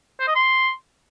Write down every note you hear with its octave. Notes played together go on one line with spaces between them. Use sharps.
C5
D#5
C6